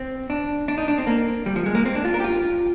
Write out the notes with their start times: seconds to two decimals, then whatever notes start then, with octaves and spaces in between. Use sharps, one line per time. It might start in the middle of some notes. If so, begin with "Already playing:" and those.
Already playing: C4
0.30 D4
0.68 D4
0.78 D#4
0.88 D4
0.98 C4
1.07 A#3
1.46 G3
1.56 F3
1.66 G#3
1.75 A#3
1.85 C4
1.95 D4
2.05 F4
2.14 A#4
2.20 G4
2.24 F4